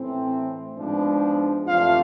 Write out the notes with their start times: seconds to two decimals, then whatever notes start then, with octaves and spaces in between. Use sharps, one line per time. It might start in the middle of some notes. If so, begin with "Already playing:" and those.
Already playing: A2 E3 A3 C4
0.78 G#2 F3 G#3 B3 D4
1.67 F2 C3 E3 A3 D4 F4 F5